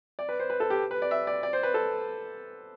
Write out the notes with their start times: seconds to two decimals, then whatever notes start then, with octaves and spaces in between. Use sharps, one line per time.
0.19 D5
0.29 B4
0.40 C5
0.50 B4
0.60 A4
0.70 G4
0.91 B4
1.02 D5
1.11 E5
1.27 D5
1.43 D5
1.53 C5
1.63 B4
1.74 A4